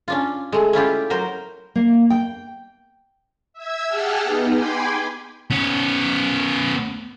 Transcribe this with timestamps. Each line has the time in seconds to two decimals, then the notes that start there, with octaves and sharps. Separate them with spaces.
0.08 C#4 D4 F4
0.52 G#3 A3
0.73 C#4 E4 F4 G4
1.10 F#3 A#4 C5
1.76 A#3
2.10 G5
3.53 E5 E6 G#6
3.87 G4 G#4 F#5 G5 A5 F6
4.24 B3 D#4
4.53 G5 G#5 B5 C6 D6 G#6
5.50 B3 C#4